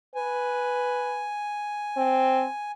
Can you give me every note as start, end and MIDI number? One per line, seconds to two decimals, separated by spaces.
0.15 1.29 71
0.15 2.72 80
1.97 2.45 60